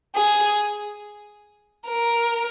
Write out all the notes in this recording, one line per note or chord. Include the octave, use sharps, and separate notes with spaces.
G#4
A#4